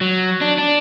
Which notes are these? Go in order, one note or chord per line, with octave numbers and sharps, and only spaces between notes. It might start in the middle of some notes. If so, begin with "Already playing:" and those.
F#3
D4
D4